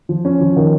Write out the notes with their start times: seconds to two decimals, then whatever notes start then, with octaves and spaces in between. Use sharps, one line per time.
0.09 F3
0.25 C#4
0.40 F3
0.56 D#3